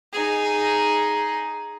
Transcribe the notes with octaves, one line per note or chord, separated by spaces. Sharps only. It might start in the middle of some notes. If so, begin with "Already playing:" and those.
D#4 G#4